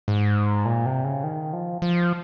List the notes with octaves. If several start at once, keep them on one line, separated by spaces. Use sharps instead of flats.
G#2
A#2
C3
C#3
D#3
F3
F3